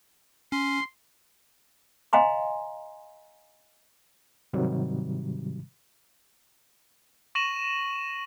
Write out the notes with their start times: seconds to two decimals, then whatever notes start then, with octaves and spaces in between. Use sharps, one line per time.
0.52 C#4 C6
2.13 D#5 F5 G#5 A#5 C6
4.53 G#2 C3 D#3 F#3 G3
7.35 C#6 A#6 D#7 E7 F#7